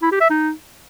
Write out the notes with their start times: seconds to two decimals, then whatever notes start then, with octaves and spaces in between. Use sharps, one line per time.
0.02 E4
0.12 G4
0.21 E5
0.30 D#4